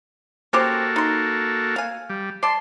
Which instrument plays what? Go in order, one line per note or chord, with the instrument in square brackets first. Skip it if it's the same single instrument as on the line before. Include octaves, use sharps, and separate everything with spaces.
[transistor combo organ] A#3 F#4 A4 [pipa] C#4 G4 C5
[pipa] D#4 C6
F5 G#5
[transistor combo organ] G3
[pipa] D5 A5 [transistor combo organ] C6